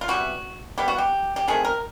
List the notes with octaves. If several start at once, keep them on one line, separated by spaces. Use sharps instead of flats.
F4
C3 E3 G3 B3 F#4
C3 E3 G3 B3 G4
F#4
G4
G4
D#3 F#3 A3 C4 G#4
A#4